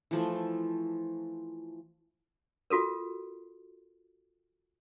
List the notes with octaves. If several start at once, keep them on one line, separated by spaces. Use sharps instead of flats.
E3 F3 A3
F4 F#4 A4 A#4